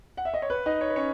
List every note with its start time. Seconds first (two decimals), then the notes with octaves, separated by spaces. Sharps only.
0.17 F#5
0.25 E5
0.34 D#5
0.42 C#5
0.50 B4
0.66 D#4 D#5
0.81 C#5
0.89 B4
0.96 C#4 C#5